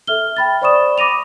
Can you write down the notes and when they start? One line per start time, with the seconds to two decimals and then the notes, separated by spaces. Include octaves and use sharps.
0.07 A4 E5 F6 G7
0.37 G5 B5 A6
0.61 C5 D5 B5 C#6 D#6 E7
0.98 B5 D6 A#6 D#7 F7